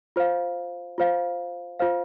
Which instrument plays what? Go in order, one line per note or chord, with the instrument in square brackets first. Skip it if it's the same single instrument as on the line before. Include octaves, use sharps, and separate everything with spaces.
[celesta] F4 C5 F5
F4 C5 F5
F4 C5 F5